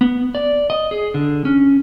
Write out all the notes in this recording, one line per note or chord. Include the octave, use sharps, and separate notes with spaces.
B3
D5
D#5
G#4
D3
C#4